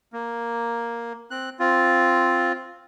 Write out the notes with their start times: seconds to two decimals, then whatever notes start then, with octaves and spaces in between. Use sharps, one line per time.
0.13 A#3
1.31 C4 F#6
1.59 C4 F4